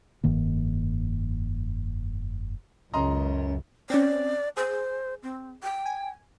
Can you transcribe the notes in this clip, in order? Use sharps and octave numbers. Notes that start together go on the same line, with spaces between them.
F1 G2 D#3 A#3
C#2 F#2 D#5 A#5 C6
C4 C#4 D5
G#4 C5
C4
G5
G#5